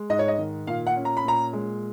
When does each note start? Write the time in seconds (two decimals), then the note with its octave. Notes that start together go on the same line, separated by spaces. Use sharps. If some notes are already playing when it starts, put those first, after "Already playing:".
Already playing: G#3
0.10 G#2 D#5
0.19 C#5
0.28 D#5
0.38 D#3
0.67 A#2 F5
0.87 F#5
0.96 C#4
1.05 A#5
1.17 B5
1.24 A#2 A#5
1.53 G#3